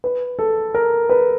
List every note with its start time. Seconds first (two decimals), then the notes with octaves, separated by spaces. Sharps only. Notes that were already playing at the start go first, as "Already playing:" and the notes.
0.04 B4
0.39 A4
0.74 A#4
1.10 B4